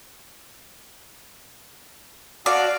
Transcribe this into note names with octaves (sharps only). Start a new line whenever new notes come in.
F#4 D5 F5 A5